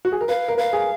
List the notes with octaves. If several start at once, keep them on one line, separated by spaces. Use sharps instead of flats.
F#4
G#4
A#4
B4 F5
A#4
B4 F5
G#4